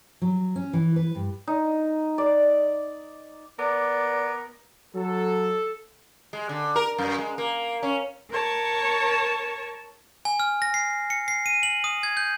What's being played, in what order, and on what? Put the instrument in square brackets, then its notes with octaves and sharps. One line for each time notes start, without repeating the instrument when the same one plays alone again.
[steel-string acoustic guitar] F#3
C#4
E3
B4
G2
[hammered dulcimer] D#4
D5
[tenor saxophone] B3 [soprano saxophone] A#4 [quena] D5 [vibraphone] D6
[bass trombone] F#3 [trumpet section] A4
[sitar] G#3
D3
A#4
F#2
G#3
A#3
C#4
[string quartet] A#4 C#5 A5 C#6
[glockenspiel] G#5
F6
A#6
C7
C#7
C7
D#7
F#7
D#6
G#6
G6